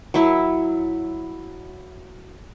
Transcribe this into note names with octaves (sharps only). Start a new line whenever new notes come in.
F#3 E4